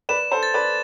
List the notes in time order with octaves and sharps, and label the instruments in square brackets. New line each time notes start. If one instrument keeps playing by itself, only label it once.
[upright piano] B4 D5 [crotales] E7
[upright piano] A4 C5
[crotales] A6
[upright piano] B4 D5